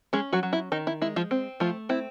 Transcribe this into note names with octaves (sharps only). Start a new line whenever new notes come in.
G#3 C#4 G#4
F#3 F#4
F#3
E4
D#3 D#4
E4
G#3 E4
F3 F4
C4
F3 A3 F4
C4 E4